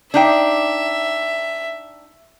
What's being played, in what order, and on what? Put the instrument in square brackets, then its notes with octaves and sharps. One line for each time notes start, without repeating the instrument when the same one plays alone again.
[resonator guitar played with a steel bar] D4 D#4 G5 [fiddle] E5